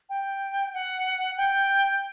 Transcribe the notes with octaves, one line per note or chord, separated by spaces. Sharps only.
G5
F#5
G5